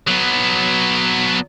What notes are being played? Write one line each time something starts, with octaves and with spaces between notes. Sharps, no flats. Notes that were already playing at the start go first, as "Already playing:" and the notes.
F#3 B3